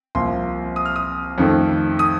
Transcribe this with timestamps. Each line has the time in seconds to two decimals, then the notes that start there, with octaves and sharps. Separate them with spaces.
0.15 C2 C3 F3 A#3 C6
0.76 D#6
0.85 F6
0.96 D#6
1.38 F2 D#3 A3
1.99 D#6